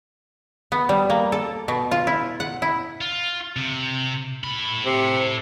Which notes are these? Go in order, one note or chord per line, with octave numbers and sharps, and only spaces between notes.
B3
G3
A#3
A4
B2
F4
E4
F#5
E4
F4
C3
A2 B5
C3